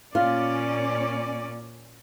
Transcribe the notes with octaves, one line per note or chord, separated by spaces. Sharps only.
A#2 C#4 F4 D5